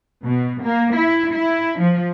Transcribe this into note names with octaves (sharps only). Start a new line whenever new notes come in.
B2
A#3
E4
E4
F3